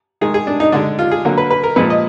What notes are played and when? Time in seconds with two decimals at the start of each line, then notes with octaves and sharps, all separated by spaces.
0.21 D#3 G#3 G#4
0.34 G#4
0.47 D4
0.60 D#4
0.72 D3 G#3 D4
0.99 F4
1.11 G#4
1.25 D3 F#3 A#3
1.38 B4
1.51 B4
1.64 A#4
1.76 A#2 F3 G#3 B4
1.90 D#5